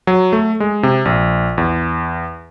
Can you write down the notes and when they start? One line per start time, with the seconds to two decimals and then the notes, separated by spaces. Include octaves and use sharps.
0.07 F#3
0.33 A3
0.60 G#3
0.83 C3
1.05 A#1
1.58 E2